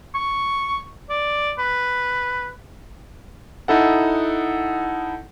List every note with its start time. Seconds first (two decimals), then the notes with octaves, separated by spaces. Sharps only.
0.15 C#6
1.10 D5
1.58 B4
3.68 D#4 E4 A4 F#5